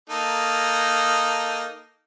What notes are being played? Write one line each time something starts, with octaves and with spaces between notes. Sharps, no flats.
A#3 D#4 A4